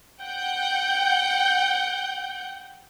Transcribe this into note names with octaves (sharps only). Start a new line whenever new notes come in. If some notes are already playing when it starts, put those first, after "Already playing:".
F#5 G5 G6